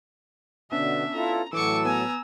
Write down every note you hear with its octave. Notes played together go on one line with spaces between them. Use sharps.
B2 D3 B3 C#4 D4 E5
E4 F4 A4 A#5
A2 E3 F#3 A4 C#6 D6 E6
B3 G#5 A#5